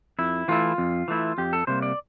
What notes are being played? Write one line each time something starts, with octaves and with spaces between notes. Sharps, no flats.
F2 E4
E3 A3 E4 F4
F2
E3 A3 E4
F2 G4
A4
C3 G3 A#3 C5
D5